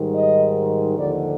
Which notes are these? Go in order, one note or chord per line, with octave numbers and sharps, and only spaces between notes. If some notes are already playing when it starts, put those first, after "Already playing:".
Already playing: G#2 D#3 G3
D#5
D#2 D3 F3 D5